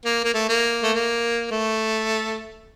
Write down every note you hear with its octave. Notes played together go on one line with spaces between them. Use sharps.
A#3
A#3
A3
A#3
A3
A#3
A3